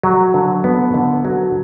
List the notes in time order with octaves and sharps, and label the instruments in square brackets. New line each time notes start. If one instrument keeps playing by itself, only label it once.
[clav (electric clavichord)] F#3
D3
B3
D3
F#3